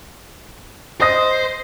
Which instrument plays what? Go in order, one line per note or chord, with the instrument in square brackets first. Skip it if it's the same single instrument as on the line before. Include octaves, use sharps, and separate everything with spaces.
[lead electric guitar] C5 [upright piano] D#5 D#6 A#6